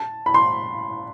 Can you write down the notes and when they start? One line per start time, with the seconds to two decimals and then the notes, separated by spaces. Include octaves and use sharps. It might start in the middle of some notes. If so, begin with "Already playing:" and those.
Already playing: A5
0.26 B5
0.34 C6